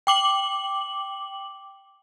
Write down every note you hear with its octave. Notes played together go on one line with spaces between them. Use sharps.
G5 D6 F#7